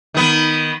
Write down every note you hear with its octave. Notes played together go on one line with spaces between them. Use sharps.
D#3 B3